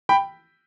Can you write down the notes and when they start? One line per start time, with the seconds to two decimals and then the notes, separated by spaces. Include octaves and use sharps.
0.09 G5 B5